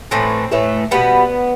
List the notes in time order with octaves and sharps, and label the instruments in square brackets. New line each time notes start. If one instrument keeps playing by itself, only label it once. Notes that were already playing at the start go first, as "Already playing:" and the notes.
[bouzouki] A2 E3 A3 C4
A2 E3 A3
B2 G3 B3